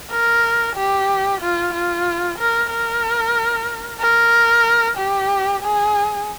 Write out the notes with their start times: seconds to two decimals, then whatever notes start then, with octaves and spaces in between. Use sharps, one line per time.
0.11 A#4
0.76 G4
1.41 F4
1.74 F4
2.38 A#4
2.70 A#4
4.00 A#4
4.97 G4
5.62 G#4